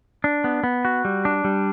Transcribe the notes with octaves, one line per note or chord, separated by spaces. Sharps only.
D4
B3
B3
F#4
G3
D4
G3